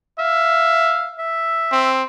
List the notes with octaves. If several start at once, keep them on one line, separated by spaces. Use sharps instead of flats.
E5 F5
E5
C4